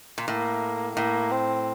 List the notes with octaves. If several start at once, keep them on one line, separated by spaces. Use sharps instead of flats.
A#2
A2 A#3
A2 A#3
C4